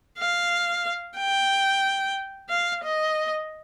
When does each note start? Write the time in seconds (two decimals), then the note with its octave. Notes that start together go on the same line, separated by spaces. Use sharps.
0.18 F5
1.17 G5
2.49 F5
2.83 D#5